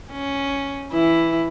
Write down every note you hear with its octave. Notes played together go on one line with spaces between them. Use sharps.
C#4
E3 E4